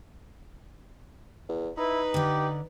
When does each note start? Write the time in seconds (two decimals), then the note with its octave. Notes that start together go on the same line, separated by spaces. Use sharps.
1.49 E2
1.78 D#4 E4 B4
2.14 D3 G4 D5